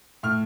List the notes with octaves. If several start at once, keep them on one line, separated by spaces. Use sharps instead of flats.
A2 F6